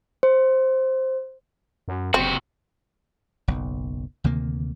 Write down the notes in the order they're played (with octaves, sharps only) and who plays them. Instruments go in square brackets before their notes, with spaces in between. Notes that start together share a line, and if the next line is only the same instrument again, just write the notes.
[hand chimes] C5
[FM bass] F#2
[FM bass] F#1 [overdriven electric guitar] C3 F#4 [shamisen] C4
[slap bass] F#1 B1
D2 C3 D#3 A#3